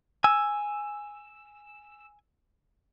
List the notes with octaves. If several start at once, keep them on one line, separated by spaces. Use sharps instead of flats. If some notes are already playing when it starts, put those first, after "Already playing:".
G#5 E6